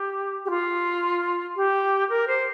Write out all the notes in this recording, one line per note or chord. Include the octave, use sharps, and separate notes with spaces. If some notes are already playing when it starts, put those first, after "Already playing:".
Already playing: G4
G4
F4
G4
A#4
C5